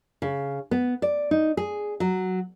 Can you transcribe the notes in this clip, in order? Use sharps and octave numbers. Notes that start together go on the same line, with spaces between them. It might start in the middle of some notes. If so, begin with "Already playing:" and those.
C#3
B3
D5
D#4
G#4
F#3